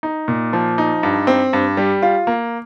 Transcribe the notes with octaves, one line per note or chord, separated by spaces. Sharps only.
D#4
A#2
F3
D#4
G2
C4
G2
G3
F4
A#3